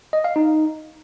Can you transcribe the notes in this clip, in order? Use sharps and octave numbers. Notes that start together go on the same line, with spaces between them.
D#5
F5
D#4